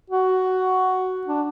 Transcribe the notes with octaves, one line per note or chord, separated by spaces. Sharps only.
F#4
D4